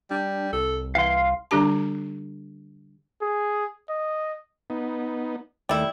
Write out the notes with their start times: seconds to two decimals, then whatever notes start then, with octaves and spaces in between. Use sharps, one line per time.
0.11 G3 D4
0.53 C2 A4
0.95 E3 F5 C6
1.51 D3 G3 D4 G4 A5
3.22 G#4
3.89 D#5
4.70 B3 D#4
5.69 D#2 G3 A3 E4